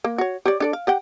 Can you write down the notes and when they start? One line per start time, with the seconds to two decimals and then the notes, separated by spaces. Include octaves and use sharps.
0.04 A#3
0.18 F#4 C#5
0.46 G4 C#5 D5
0.60 D4 A4 D5
0.73 F5
0.87 G4 F#5 G5